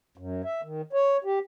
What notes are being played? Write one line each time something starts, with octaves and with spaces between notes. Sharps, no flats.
F#2
E5
D#3
C#5
G4